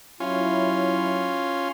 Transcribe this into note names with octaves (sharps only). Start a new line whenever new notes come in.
F#3 C#4 E4 F4